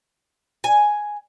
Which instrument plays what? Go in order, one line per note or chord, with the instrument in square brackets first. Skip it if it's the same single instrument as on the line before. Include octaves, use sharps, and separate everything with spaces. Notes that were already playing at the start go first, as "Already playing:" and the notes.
[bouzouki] G#5